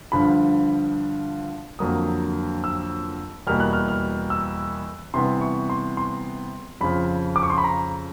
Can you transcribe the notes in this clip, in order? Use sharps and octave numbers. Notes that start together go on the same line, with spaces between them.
G2 D3 F3 B5
F2 D3 F#3 A#3 D#6
E6
E2 B2 G3 A#3 F6
F#6
F6
F6
E6
C3 E3 G3 B3 C6
C#6
C6
C6
F2 C#3 F3 B5
D6
C#6
C6
B5
A#5